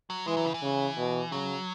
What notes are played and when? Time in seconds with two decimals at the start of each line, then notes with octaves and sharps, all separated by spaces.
0.10 F#3
0.27 E3 G#3
0.37 F#3
0.45 C#3
0.54 E3
0.63 C#3
0.97 B2
1.32 C#3 F#3